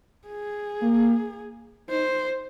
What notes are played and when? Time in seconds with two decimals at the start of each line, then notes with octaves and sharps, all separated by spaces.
0.28 G#4
0.82 A#3
1.89 D#4 C5